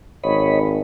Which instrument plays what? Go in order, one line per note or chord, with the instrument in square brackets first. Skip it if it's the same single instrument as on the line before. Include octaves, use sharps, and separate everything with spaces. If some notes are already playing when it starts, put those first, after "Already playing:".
[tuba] G#1 [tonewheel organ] C#5 D#5 B5